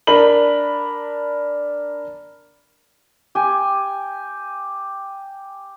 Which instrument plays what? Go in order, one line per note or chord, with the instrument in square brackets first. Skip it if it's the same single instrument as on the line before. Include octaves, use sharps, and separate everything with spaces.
[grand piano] D4 A#4 B5 F#7
[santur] G4 G#5